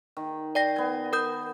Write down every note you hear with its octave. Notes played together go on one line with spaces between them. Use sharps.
D#3
D5 G5 A#6
B3 G#5
A#4 D#6 G6